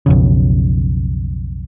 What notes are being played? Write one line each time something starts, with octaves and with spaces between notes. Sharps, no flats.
B1 F2 C#3